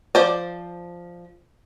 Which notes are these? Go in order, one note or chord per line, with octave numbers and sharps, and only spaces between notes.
F3 C5 D5